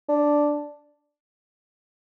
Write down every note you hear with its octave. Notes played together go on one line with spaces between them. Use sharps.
D4